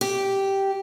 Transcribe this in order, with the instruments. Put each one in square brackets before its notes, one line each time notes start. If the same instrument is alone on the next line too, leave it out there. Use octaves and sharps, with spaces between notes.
[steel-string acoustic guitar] G4